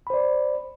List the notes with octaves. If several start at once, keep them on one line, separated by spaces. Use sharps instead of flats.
C5 D5 B5